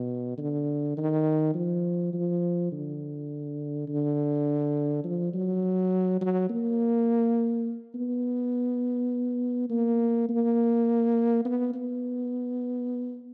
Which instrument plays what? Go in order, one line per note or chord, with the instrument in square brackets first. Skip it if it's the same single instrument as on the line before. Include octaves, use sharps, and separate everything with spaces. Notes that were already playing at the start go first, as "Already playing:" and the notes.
Already playing: [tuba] B2
D3
D#3
F3
F3
D3
D3
F3
F#3
F#3
A#3
B3
A#3
A#3
B3
B3